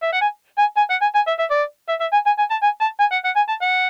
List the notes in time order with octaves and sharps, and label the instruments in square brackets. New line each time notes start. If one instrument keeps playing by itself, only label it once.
[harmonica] E5
F#5
G#5
G#5
G#5
F#5
G#5
G#5
E5
E5
D5
E5
E5
G#5
G#5
G#5
A5
G#5
A5
G#5
F#5
F#5
G#5
A5
F#5